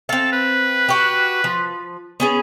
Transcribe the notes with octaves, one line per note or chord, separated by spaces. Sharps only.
C4 A4 F5
B4
F#4 G4
F3
B3 C#4 G#4